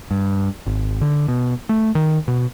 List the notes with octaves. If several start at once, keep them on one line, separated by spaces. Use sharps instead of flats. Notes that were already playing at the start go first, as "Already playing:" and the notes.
G2
G#1
D3
B2
A3
D#3
B2